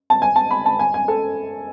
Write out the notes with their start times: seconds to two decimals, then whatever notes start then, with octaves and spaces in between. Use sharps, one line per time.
0.10 A5
0.22 G#5
0.36 A5
0.51 B5
0.66 A5
0.79 G#5
0.94 G#5
1.08 A4